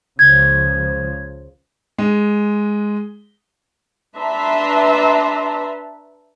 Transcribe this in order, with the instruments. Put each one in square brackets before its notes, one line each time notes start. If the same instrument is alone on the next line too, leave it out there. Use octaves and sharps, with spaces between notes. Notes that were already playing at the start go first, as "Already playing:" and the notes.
[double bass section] C#2 C#3 F3 [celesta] G#6
[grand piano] G#3
[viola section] D4 B4 E5 A5 A#5 C6